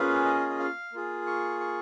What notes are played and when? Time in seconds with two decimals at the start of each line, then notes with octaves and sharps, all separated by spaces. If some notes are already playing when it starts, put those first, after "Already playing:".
Already playing: A#3 C#4 F4 G#4 B4
0.25 D#5
0.50 D#5
0.60 F5
0.93 A#3 F4 G#4
1.27 C#6
1.60 C#6